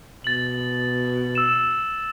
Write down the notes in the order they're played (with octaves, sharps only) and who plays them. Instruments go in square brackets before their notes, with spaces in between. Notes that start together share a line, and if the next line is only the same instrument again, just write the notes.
[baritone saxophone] B2 [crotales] A6 F#7
[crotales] E6 E7